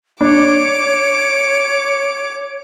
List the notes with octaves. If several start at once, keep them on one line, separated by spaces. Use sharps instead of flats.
D4 C#5 D6